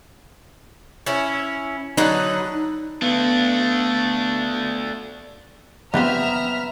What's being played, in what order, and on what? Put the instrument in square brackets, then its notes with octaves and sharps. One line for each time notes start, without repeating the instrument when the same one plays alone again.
[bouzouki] C#4 E4
[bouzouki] D3 F#3 B4 [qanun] D#4
[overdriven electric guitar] A3 D4 [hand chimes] B3
[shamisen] G3 C4 F4 [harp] B3 [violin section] E5 A#5 F6